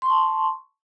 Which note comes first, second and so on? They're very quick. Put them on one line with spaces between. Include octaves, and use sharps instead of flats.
C6 C#6 A5